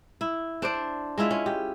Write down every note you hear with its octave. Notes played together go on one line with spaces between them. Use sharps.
E4
D4 C5 D5
G#3 E4 F4 E5
C#4
G4